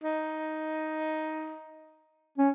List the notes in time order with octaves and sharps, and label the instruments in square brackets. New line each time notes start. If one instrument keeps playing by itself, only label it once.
[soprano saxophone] D#4
[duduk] C#4